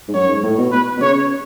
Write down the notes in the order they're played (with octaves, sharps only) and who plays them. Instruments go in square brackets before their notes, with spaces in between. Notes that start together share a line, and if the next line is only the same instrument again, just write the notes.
[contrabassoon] G#2
[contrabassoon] F#2 [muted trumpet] C#5
[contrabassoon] G#2
A2
B2
[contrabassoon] B2 [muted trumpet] B4
[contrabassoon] B2
[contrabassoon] C#3 [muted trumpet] C#5
[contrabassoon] C#3